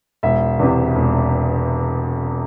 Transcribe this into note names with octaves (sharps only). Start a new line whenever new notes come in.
E1 E5
E2 C3
E1